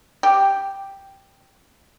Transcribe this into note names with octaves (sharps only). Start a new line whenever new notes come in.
G4